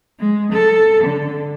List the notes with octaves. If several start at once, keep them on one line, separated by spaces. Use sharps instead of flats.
G#3
A4
D3